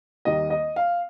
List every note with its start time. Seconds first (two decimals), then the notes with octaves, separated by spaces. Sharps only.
0.25 D#2 D#3 G3 A#3 D#5
0.50 D#5
0.76 F5